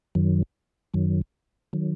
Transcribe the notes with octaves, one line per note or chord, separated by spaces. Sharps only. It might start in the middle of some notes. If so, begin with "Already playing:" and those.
F#2 D#3 F#3
F#2 D#3 F#3
D#3 F#3